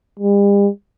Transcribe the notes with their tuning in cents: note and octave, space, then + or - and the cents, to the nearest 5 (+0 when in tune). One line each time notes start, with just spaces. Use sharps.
G3 +45